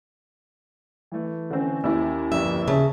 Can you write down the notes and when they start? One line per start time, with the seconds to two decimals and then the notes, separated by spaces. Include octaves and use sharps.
1.12 E3 A3
1.50 D3 C4 C#4
1.84 D#2 E4 E6
2.32 G1 F2 G3 E5
2.68 C#3 E5 A5